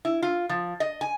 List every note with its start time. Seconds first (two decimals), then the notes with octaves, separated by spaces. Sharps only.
0.05 E4
0.22 F4
0.49 F3
0.80 D#5
1.01 G#5